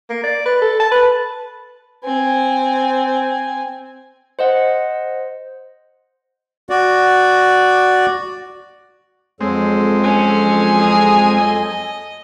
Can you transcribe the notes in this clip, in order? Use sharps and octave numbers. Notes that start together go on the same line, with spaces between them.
A#3
D5
B4
A4
A5
B4
C4 G#5
C5 D#5 F#5
F#4 D5
F2 F#3 G#3 C4 G#4 A4
C#4 G#5
G#4 A#5
D#5